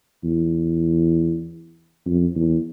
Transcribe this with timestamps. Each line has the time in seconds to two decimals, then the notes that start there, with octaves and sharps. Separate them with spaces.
0.24 E2
2.06 F2
2.36 E2